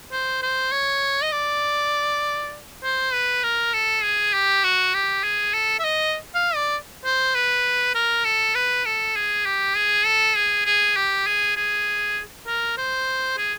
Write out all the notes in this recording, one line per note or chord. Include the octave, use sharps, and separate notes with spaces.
C5
C5
C#5
D#5
D5
C5
B4
A#4
A4
G#4
G4
F#4
G4
G#4
A4
E5
D#5
F5
D5
C5
B4
A#4
A4
B4
A4
G#4
G4
G#4
A4
G#4
G#4
G4
G#4
G#4
A#4
C5
G#4